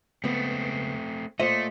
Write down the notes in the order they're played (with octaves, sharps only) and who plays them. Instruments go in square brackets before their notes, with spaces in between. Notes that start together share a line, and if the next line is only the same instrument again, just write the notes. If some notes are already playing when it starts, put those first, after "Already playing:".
[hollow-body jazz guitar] C#2 B3 [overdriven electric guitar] A3 C4
[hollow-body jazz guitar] A#2 C5 D#5 [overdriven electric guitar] A3